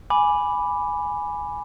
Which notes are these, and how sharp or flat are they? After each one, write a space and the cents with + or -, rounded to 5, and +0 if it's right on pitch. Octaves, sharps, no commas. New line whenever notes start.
G#5 +0 B5 +0 D6 +0